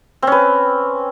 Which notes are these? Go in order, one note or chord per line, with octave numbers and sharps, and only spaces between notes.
C4 C#4 B4